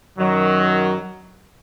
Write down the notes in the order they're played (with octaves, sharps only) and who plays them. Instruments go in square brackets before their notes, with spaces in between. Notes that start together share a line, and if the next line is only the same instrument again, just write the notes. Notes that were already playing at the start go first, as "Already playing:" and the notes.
[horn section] F#2 D#3 F#3